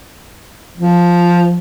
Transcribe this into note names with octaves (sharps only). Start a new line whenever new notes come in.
F3